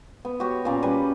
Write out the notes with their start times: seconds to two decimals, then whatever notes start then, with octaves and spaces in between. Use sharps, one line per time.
0.25 B3
0.40 F#4 G4 C#5
0.65 A#2 C#4 D5 A#5
0.83 G3 C#4 B4